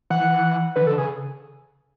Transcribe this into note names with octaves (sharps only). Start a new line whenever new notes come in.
E3 F#5
D3 B4
E3
D3 A4
C#3 G#4